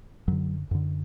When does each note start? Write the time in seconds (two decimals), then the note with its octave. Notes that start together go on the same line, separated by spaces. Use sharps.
0.28 F#2 D3 F#3
0.71 F#2 D3